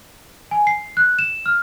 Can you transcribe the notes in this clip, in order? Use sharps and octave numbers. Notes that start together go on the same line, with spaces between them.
G#5
C7
F#6
E7
F6